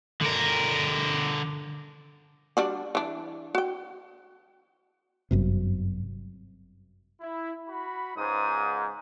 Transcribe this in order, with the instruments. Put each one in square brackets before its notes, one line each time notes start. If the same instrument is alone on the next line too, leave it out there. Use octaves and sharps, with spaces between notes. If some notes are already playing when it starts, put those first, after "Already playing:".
[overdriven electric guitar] D3 A#4
[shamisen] G3 D4 F#4
E3 D4
F#4 G5
[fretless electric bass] G1 F#2 C3
[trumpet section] E4
F#4 B5
[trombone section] C#2 G#2 [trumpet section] D#4 C5 D#6